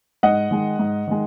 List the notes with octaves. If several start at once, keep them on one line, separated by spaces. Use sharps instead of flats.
G#2 D#5 F#5
D#3 G#3
G#2
D#3 G#3